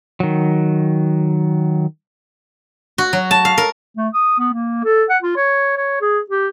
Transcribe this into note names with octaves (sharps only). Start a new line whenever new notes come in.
D#3 F#3
F#4
F#3
A5
F5
A#4
A3
D#6
B3
A#3
A4
F#5
F4
C#5
C#5
G#4
G4